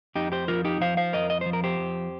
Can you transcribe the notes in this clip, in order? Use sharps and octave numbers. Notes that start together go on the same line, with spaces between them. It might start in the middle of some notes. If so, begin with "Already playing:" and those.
F2 D#4 G4
G4 C5
F3 F4 A#4
D#4 G4
F3 C5 F5
C5 F5
F2 A#4 D#5
D#5
F3 C5
A#4
G4 C5
F2